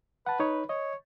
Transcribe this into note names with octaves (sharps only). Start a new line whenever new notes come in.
B4 F#5 A5
D#4 C#5
C#5 D#5